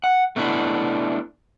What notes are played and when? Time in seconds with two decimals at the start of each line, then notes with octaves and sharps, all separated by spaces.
0.04 F#5
0.36 A3 B3 C#4 D4 E4